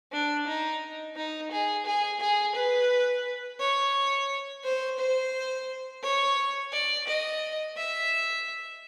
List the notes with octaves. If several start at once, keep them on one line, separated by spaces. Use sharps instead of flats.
D4
D#4
D#4
G#4
G#4
G#4
B4
C#5
C5
C5
C#5
D5
D#5
E5